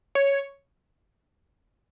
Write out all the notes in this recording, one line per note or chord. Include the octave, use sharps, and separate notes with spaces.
C#5